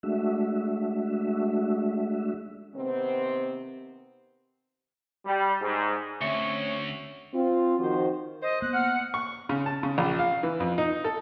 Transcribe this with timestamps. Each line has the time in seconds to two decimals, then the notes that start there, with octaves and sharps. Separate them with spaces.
0.03 G#3 A3 D4 F#4 E5
2.75 C3 D#3 B3 C4
5.26 G3
5.60 G#2
6.21 D2 C4 C#4 C#5 E5 C#6
7.33 C4 F4
7.79 D#3 F3 F#4 C5
8.42 C5 D#5
8.62 A#3 B3 F#6
8.74 F#5 F6
9.14 C#6
9.49 C#3
9.66 A5
9.83 C#3
9.98 A#1
10.19 F5
10.43 E3
10.60 F2
10.78 D#4
11.04 A4